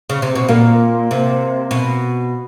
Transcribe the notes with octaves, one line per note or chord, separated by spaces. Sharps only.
C#3
C3
B2
A#2 A#3
C3
B2